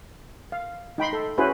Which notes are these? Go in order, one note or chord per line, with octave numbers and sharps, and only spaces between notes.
F5
D#4 G5 B5 C6
A4
C#4 E4 F#4 G#4 B4 C5